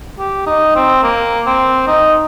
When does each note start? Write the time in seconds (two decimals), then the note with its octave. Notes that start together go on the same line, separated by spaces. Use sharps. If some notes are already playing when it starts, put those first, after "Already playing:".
0.19 G4
0.46 D#4
0.75 C4
1.03 A#3
1.46 C4
1.87 D#4